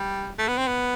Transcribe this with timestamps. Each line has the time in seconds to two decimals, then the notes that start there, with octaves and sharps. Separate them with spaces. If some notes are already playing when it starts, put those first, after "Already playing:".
Already playing: G3
0.38 A3
0.48 B3
0.57 C4
0.67 B3